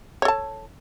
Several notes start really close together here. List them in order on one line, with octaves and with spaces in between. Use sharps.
C#5 A4 A5